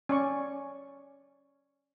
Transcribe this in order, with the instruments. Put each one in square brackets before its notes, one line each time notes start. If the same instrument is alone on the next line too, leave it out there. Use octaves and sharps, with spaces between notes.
[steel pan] C#4 D5 C#6